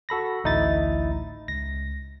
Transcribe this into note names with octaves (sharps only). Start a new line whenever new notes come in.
F#4 A4 B5 A#6
A1 D2 D#4 E4 E5 A6
C#2 A#6